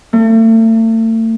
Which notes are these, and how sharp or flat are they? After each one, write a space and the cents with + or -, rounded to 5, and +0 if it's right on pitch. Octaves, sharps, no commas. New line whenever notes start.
A3 +40